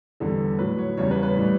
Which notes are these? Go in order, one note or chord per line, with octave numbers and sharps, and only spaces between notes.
E2 D3 G3 A4
A2 F#3 B4
C#5
E2 C#3 G3 C#5
B4
B4
A2 E3 G3